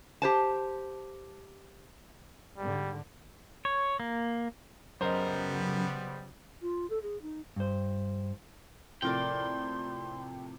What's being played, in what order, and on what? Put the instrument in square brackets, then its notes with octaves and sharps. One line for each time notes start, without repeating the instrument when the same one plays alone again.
[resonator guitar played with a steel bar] G4 C5 A5
[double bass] G#2 D3 [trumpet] G3
[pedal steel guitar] C#5
A#3
[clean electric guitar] F#2 A#4 [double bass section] C#3 F#3 [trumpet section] G3 B3 [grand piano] C5 D#5
[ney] F4
A4
G#4
D#4
[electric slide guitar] G2 C5
[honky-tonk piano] A2 C3 F3 [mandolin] A4 A#4 D5 [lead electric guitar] G5 [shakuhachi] C6